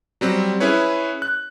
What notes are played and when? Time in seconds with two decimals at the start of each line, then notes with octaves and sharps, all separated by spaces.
0.21 F#3 G3 C4
0.60 C#4 E4 G#4 B4 C#5
1.22 F#6